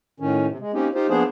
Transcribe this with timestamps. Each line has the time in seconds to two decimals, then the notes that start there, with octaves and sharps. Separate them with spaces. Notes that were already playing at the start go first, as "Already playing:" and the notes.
0.20 A2 D#3 C#4
0.48 C3
0.60 G#3
0.74 A#3 C4 C#4 D#4 G4
0.95 D#4 F4 G4 C5
1.09 F3 A#3 B3 D4 G#4 C5